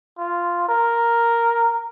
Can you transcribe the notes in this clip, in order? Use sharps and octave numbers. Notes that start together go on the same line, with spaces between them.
F4
A#4